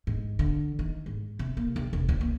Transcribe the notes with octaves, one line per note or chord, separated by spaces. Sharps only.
G#2
D3
D#3
G#2
C3
A#3
C2
E1
C#2
A#3